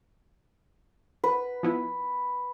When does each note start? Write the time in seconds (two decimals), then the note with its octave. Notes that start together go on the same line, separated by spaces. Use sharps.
1.24 B4
1.63 F3 B3 E4